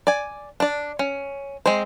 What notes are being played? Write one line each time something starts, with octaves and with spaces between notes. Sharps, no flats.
D5 G#5
D4 D5
C#4
G#3 C4 C5